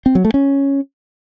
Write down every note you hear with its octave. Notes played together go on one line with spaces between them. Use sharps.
C4
F#3
A3
C#4